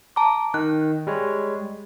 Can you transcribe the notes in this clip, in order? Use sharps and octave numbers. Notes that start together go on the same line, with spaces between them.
A5 A#5 D6
D#3 F#6
G3 G#3 C#5